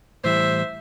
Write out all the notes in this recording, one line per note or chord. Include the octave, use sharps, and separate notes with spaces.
A2 E3 G3 C5 E5